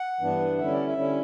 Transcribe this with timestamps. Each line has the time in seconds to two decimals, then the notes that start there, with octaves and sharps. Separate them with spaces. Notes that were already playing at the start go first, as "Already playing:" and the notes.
Already playing: F#5
0.20 G2 E3 B3 D4
0.58 D3 G3 C#4 E4 E5
0.72 D5
0.87 E5
0.97 D3 G3 C#4 E4